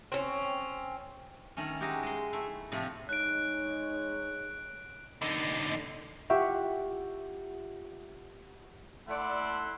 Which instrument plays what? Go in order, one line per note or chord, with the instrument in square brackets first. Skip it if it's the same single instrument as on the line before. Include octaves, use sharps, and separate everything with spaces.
[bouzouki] C4 C#4
[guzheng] D#3 A3 C#4
F#3 G#3 D#4 E4 F#4 G4
G#3 C6
A3 E4
A2 C3 F3 A3 E4
[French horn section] G#3 D#4 C#5 [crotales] F#6 D7
[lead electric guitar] D3 D#4
[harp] F4 G4 E5 F#5 C#6
[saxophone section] A3 A4 D5 [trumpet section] E4 F#5 C6